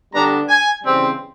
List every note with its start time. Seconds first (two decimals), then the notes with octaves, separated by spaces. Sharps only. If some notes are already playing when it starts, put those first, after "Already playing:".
0.14 D3 G3 B3 D4 A#5
0.49 G#5
0.84 C#3 E3 G3 C4